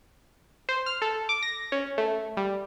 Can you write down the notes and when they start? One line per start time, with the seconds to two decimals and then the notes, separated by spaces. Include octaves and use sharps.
0.69 C5
0.86 F6
1.02 A4
1.29 D6
1.43 A#6
1.72 C#4
1.98 A3
2.37 G3